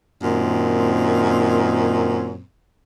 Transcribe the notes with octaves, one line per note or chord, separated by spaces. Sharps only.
F#2 A#2 D#3 C4